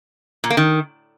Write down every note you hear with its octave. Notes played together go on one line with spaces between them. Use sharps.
A#2
A#3
D#3